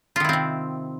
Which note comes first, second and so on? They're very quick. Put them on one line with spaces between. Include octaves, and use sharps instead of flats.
F4 D#3 E4 C4 C3